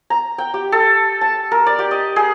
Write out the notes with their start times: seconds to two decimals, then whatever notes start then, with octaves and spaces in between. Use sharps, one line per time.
0.10 A#5
0.38 G5
0.54 G4
0.72 A4
1.21 A5
1.52 A#4
1.66 D5
1.79 G4
1.91 D#5
2.16 G#4